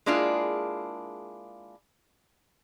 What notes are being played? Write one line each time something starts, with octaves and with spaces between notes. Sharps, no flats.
G#3 A#3 D4 E4 F4 G#4